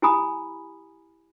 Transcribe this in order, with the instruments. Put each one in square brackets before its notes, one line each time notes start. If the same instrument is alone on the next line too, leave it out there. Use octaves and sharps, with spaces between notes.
[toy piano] E4 G4 G#5 A#5 B5 D#6